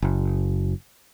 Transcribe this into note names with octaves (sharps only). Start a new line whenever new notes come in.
F#1